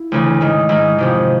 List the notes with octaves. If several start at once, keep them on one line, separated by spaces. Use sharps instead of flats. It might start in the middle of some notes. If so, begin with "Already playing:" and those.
Already playing: E4
D2 C#3 E3
G#2 D#3
G#2 D#3 E4
F2 C3 D#3